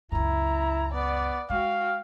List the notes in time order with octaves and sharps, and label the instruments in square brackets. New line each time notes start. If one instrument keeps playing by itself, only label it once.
[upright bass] C#2 F#2 [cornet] E4 [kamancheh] A#5
[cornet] B3 [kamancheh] D5
[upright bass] G#3 [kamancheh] F#4 G5 [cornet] F5